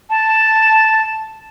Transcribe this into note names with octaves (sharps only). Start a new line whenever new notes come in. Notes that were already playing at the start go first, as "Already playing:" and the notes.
A5